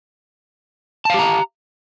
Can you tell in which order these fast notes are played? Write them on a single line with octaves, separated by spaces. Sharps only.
A5 F5 G4 A#5